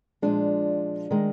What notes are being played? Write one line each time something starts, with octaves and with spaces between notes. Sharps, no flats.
A#2 F3 G#3 D4
D#3 G#3